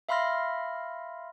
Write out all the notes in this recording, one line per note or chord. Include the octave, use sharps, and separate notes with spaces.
E5 F5 B5 C6 F6 A#6